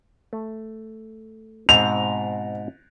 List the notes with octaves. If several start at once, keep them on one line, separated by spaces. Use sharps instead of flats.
A3
G#2 B2 C4 F7